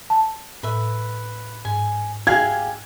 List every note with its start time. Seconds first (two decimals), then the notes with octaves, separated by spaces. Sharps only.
0.10 A5
0.63 A2 B4 E5
1.65 G#2 G#5
2.27 G4 G#4 F5 G#6